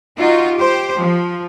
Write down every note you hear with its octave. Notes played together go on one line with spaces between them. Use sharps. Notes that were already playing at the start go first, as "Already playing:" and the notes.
D#4 F4 F#4
G4 C5
F3